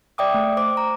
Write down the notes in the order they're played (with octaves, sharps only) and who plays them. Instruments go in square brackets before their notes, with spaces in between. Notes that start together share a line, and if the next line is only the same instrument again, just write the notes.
[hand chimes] D5 E5 G5 D6 D#6
A3
C5 D6
A#5